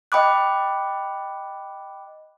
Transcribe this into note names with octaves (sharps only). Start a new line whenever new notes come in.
D#5 G5 B5 D6 F#6